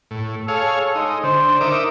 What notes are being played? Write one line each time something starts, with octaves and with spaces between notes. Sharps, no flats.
A2
G#4 A4 C#5 F5
G#3 D#4
D3 C5
D#4 A#4 E5 D6